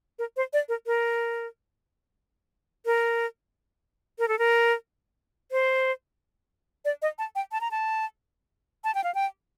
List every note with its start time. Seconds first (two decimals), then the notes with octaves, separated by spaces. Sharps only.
0.19 A#4
0.37 C5
0.53 D5
0.69 A#4
0.87 A#4
2.86 A#4
4.19 A#4
4.28 A4
4.39 A#4
5.52 C5
6.85 D5
7.02 D#5
7.18 A5
7.35 G5
7.52 A5
7.61 A#5
7.71 A5
8.84 A5
8.95 G5
9.04 F5
9.15 G5